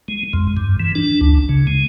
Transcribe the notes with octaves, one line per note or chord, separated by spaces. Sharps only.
G#3
F2
G2
E3
D4
D2
C#3
G#3